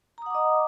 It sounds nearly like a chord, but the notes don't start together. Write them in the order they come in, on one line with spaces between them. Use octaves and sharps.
A#5 D#6 F#5 D6 D#5